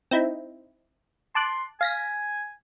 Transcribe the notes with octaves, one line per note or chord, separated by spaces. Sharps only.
C4 D#4 E4
A5 C6 D6 F#6
F5 G#5 A#6 B6